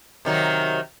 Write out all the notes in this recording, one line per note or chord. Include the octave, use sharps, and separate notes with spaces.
C3 D#3 F#3